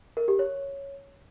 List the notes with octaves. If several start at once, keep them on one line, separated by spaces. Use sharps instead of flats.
A#4
G4
C#5